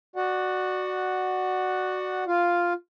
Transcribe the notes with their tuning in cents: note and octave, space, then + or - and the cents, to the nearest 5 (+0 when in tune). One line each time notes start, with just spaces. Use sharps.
F#4 +0 D5 +20 F#5 +0
F4 +0 F5 +0